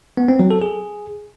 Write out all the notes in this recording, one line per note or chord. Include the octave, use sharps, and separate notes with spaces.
B3
C4
F#3
A4
G#4